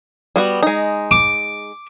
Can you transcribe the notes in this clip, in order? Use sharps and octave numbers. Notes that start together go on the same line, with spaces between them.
G3 B3 F#4
G#3 D#4
D6